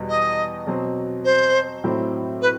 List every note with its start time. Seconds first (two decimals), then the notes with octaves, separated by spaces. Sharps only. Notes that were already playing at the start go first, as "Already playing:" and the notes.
Already playing: E2 B2 G3
0.09 D#5
0.67 B2 F#3 C4
1.24 C5
1.84 A2 F#3 C4 E4
2.42 B4